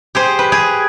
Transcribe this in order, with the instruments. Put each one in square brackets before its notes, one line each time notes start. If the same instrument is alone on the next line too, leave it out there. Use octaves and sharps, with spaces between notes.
[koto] G4 G#4 C5
B4
G4 G#4